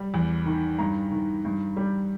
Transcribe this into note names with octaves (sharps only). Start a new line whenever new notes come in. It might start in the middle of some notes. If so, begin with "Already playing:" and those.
Already playing: G3
E2
D#3
G2 A#5
D#3
G2
G3